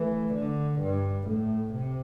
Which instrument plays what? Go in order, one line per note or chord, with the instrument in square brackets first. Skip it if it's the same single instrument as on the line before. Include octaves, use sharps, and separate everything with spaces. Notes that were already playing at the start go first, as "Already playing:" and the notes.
Already playing: [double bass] E3 [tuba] A3
[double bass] D3
G2
[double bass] A2 [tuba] A3
[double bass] C3